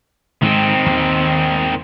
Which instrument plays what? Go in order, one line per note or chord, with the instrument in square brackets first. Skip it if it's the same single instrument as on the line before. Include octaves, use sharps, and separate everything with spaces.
[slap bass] G#2 G#3 [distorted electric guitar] D#3 C4
[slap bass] D#2